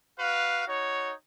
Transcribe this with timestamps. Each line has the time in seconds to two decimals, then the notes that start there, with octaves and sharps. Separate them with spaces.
0.18 F#4 B4 F5
0.66 D#4 F#4 C#5